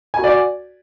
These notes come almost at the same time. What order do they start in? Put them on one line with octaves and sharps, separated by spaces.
G#5 F#4 D5